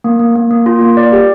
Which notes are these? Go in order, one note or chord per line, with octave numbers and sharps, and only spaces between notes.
A#3
A#3
A#3
A#3
F4
A#3
D5
G4